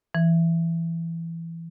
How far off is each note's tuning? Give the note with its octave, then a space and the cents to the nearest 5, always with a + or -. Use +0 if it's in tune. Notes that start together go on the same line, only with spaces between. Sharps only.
E3 +15